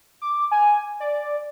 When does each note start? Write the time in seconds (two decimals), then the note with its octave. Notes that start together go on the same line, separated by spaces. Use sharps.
0.22 D6
0.51 G#5
1.00 D5